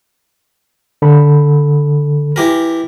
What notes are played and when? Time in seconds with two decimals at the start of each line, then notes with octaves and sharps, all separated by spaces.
1.02 D3 A4 B5
2.36 E3 G4 A#4